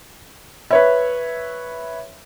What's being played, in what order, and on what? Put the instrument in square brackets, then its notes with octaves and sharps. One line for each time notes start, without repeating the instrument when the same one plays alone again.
[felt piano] B4 C#5 E5